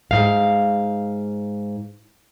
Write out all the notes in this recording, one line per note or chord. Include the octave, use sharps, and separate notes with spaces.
G#2 F5